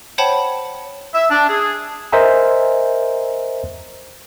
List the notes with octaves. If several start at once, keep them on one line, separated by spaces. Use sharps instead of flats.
C5 C#5 F#5 G5 A5 B5
E5
D4
G#4
A#4 C5 D#5 E5 G#5 A#5